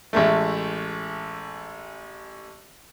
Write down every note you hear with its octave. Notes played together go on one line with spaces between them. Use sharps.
A1 G#3 A3